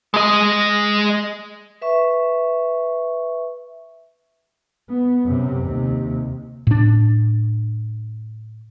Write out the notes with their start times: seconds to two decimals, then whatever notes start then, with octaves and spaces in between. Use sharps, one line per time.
0.14 G#3 D#5
1.82 B4 E5 C#6
4.89 B3
5.25 F#2 C3
5.64 D#2 C3
6.67 A2 D4